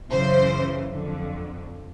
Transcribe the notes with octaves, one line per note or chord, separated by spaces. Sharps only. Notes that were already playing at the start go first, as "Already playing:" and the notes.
F#2 C#3 E3 C5
F2 D3